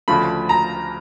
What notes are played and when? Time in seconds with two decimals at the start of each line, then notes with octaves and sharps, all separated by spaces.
0.08 D2 C#3 F3 A3 B5
0.49 A#5